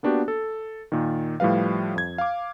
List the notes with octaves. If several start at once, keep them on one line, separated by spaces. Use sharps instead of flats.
A#3 B3 D4 F#4 G4
A4
A#2 D#3
A2 F3 G3 B4 F5
F2 G#6
F5 D6